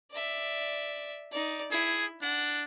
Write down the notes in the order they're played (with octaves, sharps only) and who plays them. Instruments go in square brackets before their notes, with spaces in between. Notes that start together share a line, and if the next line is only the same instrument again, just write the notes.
[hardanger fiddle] D5 E5
D#4 D5
[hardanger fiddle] E4 [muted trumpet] G#4
[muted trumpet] D4 [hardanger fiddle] F#5